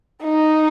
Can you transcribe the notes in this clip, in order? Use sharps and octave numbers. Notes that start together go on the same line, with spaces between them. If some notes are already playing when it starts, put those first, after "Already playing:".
D#4